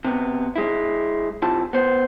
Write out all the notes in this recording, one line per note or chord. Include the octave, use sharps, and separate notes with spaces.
C3 B3
G#3 E4
C3 E4 F4 A5
B3 C5